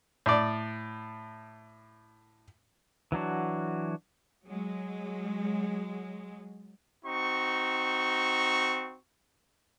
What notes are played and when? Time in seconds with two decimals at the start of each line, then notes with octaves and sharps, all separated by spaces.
0.26 A2 D5
3.12 E3 F#3 D4 F#4
4.46 F#3 G#3
7.05 C4 D#4 F#4 C#6